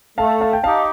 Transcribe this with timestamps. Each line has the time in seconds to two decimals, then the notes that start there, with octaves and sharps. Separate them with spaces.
0.18 A3 F5 A5
0.41 F5 A5
0.53 G5
0.64 D#4 G4 F5 A5